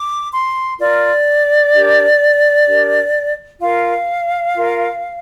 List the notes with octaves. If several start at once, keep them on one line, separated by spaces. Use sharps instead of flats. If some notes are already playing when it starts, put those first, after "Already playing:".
Already playing: D6
C6
F4 A#4 D5
D4 G4 A#4
D4 G4 A#4
F4 A#4 F5
F4 A#4